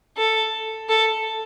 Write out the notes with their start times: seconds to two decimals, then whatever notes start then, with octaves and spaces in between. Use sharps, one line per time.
0.17 A4
0.89 A4